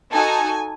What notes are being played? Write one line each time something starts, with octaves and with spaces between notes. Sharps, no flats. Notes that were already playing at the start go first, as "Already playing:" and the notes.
D#4 F#4 A4 G#5